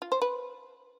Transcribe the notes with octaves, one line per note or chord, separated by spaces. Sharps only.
F4
C5
B4